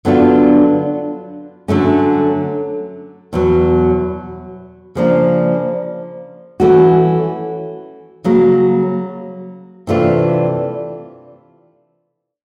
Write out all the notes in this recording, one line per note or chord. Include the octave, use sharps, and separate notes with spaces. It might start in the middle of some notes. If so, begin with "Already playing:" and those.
D3 F#3 B3 D4 F4
D3 F#3 A3 C#4
E2 B2 F#3
C#3 F3 A#3 D4
E3 A3 C#4 F#4
C#3 F#3 A#3
C3 E3 A3 D4 F4